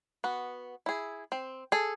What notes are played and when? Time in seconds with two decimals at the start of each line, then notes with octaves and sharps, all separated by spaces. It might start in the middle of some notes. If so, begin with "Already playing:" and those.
0.24 B3 F#4
0.86 E4 G#4
1.32 C4
1.72 G#4 A4